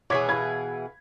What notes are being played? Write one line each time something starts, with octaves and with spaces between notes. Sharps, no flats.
B2 E3 G#4 C#5 D6 G#6 B6
F5 B5 G#6